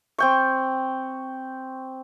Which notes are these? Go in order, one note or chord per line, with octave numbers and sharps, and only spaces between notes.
C4 G5 C#6